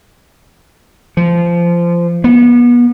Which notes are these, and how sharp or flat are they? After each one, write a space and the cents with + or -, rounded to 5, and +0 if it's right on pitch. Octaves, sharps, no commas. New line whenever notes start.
F3 -20
B3 -35